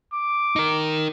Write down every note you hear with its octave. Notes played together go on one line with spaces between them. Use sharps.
D6
D#4 A#4